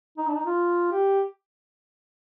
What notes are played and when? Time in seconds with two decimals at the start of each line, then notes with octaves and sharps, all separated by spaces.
0.17 D#4
0.27 D4
0.35 D#4
0.45 F4
0.92 G4